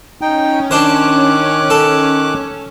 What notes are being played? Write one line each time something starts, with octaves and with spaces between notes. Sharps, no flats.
C#4 D#4 G5
D#3 D4 C5 D6 F#6
A4